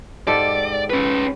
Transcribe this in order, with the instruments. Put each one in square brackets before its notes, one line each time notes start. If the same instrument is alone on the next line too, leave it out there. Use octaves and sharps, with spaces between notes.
[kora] G#2 G4 A4 [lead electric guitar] D5
[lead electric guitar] C#4 B4